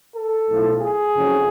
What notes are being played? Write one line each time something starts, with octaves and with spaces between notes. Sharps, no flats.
A4
B1 A2 F3
G#4
F#1 F2 C#3 F#3